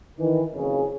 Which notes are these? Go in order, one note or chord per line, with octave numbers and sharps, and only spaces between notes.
D#3 E3
F#1 F2 C#3